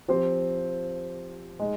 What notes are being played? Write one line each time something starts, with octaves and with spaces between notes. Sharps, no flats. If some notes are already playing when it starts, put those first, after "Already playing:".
F3 C4 G4 C5
G#3 D#4